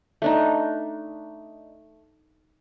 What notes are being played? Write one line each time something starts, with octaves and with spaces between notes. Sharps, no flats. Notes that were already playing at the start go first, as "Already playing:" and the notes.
A3 D4 D#4